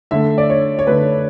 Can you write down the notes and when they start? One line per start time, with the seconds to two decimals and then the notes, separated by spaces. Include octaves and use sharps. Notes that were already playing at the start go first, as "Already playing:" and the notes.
0.11 D3 A3 E5
0.38 D5
0.50 C#5
0.79 C#5
0.87 D3 A3 B4